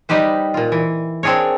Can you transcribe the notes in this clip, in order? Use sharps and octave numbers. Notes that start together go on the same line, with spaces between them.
G3 D#4 G4 B4 C5
A#2 F4
E3
C4 D4 G#4 A#4 C#5